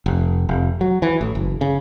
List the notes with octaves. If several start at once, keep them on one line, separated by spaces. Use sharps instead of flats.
F1
F1
F#3
E3
A1
F#1
C#3